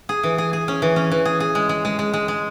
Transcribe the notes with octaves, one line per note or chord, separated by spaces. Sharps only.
G#4
E3
G#4
G#4
C#4
E3
C#4
E3
G#4
G#4
G#3
G#3
G#3
G#3
G#3
G#3